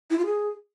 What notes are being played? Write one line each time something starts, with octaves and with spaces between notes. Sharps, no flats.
E4
F4
G#4